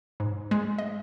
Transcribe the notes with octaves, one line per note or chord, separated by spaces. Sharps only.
G#2
G#3
D#5